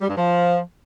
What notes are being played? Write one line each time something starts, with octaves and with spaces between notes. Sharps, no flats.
G3
G2
F3